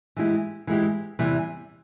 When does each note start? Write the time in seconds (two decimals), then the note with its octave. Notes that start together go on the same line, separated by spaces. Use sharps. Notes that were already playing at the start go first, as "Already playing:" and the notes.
0.16 E3 G#3 E4 G4
0.67 E3 G#3 E4 G4
1.19 E2 C3 E3 G3